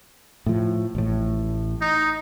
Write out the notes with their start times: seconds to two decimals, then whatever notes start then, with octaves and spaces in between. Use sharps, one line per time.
0.46 A2 F3
0.95 A1 A2
1.81 D#4